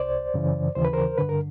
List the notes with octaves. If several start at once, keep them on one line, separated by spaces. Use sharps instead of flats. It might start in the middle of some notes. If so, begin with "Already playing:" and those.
Already playing: C2 C5 D5
F#2 C#3 E3
D#2 C#3 E3 C5
B4
A#4 C5
G2 D3 B4
A#4